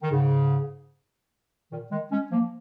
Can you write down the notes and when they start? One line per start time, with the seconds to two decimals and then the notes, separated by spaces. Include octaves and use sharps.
0.02 D#3
0.11 G#2 C#3
1.71 A#2 D#3
1.92 D#3 G#3
2.12 G#3 C#4
2.32 F3 A#3